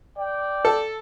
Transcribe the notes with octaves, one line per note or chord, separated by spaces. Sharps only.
D5 G5
A4